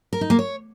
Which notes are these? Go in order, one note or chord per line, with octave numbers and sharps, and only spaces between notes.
A#4
D#4
A#3
C#5